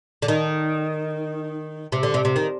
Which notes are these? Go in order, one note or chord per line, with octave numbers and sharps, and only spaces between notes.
D3
D#3
C3
D3
C3
C3
D#3